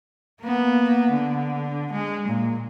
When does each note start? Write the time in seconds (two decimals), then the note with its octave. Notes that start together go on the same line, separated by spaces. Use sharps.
0.41 A#3 B3
1.10 D3
1.92 G#3
2.28 A#2